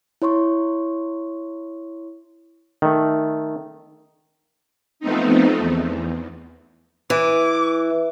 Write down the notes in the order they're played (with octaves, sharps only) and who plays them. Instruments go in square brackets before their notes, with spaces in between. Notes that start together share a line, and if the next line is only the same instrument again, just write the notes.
[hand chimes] E4 C#5 C6 C#6
[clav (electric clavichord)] D#3 A3
[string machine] F3 A3 B3 C4 D#4
E2
[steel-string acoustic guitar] E3 [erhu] D6